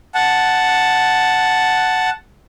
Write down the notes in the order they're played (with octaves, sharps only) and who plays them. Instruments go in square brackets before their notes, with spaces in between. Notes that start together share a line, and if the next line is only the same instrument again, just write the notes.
[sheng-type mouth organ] F#5 A5